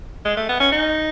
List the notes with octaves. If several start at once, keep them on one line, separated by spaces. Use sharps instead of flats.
G#3
A3
B3
C#4
D#4